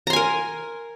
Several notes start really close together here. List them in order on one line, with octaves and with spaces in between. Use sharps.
A#5 C6 G#5 A#4